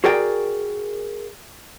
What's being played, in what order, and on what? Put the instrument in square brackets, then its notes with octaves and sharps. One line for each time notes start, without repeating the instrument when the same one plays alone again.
[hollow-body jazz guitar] F#4 G#4 A#4 D5 G5